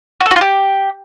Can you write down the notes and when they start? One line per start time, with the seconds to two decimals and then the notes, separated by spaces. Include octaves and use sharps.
0.21 F#4
0.26 A4
0.31 F#4
0.36 F4
0.41 G4